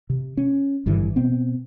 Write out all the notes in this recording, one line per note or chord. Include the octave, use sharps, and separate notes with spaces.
C3
C#4
G#1 G2 D3 E3
B2 B3 C4